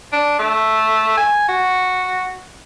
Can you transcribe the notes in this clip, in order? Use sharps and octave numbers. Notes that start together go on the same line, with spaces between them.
D4
A3
G#5
F#4